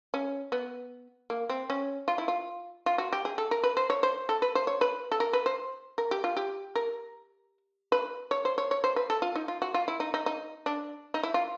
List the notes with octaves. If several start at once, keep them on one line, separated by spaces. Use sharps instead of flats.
C#4
B3
A#3
C4
C#4
F4
E4
F4
F4
F#4
G4
G#4
A4
A#4
B4
C5
C#5
C5
A4
B4
C5
C#5
B4
A4
A#4
B4
C5
A#4
G4
F4
G4
A#4
B4
C#5
C5
C#5
C#5
C5
B4
A4
F4
D#4
F4
F#4
F4
E4
D#4
D#4
D#4
D4
D#4
E4
F4